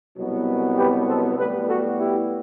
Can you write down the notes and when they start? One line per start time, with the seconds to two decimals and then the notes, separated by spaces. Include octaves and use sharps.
0.17 C2 B2 F#3 B3
0.77 G4 B4
1.07 A4 C5
1.38 A2 G3 B3 G4 B4
1.68 F#4 A4
1.98 E4 G4